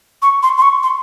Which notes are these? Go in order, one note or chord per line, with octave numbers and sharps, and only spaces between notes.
C#6
C6
C6
C#6
C6